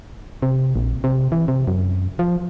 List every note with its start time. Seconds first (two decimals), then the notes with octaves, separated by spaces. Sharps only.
0.42 C3
0.76 A#1
1.04 C3
1.32 E3
1.48 C3
1.67 F#2
2.19 F3